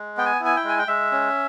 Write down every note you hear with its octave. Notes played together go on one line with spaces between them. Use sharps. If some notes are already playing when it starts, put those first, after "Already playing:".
Already playing: G#3
B3 G5
G#5
E4
G#5
G5
G#3 G#5
G5
G#3 E5
C#4